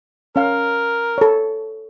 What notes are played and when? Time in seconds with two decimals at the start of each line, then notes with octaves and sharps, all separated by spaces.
0.36 C#4 A#4 F5
1.18 A4 C#5